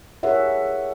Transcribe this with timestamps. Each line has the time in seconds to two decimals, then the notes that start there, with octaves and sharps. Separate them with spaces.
0.23 G4 G#4 A#4 C#5 E5 F#5